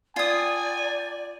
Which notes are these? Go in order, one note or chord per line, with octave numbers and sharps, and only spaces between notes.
F4 D5 G#5 D#6